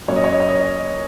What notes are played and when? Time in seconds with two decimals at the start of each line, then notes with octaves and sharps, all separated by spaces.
0.08 F#2 F#3 A#3 C#4 C#5
0.16 D#5
0.24 C#5
0.33 D#5
0.40 C#5
0.49 D#5